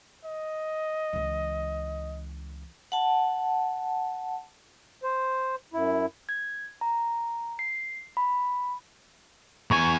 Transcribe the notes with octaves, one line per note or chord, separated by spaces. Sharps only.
D#5
C#2 E3
F#5 A5
C5
F#2 E4
G#6
A#5
C7
B5
E2 G#5 C#6